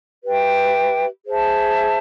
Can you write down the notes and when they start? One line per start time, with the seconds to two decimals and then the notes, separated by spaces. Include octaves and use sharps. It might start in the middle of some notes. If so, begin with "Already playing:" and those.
0.23 G4 B4 E5 G5
1.25 G#4 C5 E5 A5